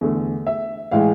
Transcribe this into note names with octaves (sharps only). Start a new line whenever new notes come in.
E2 D3 A3
E5
A2 E3 G#3 F5